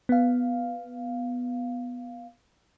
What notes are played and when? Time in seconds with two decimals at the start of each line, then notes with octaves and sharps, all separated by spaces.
0.09 B3 F5